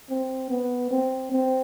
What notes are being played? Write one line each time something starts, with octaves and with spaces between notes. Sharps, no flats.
C4
B3
C4
C4